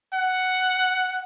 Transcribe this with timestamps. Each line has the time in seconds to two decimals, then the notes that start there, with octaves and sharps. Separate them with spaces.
0.14 F#5